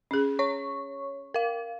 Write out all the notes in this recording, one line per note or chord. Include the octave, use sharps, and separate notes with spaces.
C#4 G#4
C#5 C#6
A#4 F5